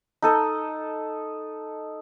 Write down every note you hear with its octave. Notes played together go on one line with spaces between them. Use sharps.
D#4 A4 D#5